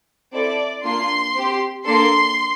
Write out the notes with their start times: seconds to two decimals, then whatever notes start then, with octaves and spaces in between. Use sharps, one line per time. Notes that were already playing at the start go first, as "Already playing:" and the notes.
0.32 C4 E4 A4 D5
0.83 A#3 D4 F4 C6
1.34 C4 G4
1.84 A#3 D4 A4 C6